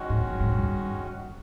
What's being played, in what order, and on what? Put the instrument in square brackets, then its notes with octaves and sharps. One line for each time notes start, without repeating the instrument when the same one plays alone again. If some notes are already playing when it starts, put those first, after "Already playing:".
Already playing: [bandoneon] D#3 G#3 C#4 F#4
[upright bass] G#2
G2
G#2
G2